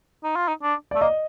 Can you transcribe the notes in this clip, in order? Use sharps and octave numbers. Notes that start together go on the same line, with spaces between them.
D#4
F4
D#4
D4
A3 D5
A#3 D#5